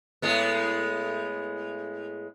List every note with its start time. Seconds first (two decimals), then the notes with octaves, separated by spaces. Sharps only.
0.22 A2 G#3 B3